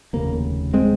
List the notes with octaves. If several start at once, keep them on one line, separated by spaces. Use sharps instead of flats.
F1 D#2 C#3 A#3
G#3 C4